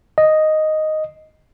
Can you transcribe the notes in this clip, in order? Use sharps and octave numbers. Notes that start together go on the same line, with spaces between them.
D#5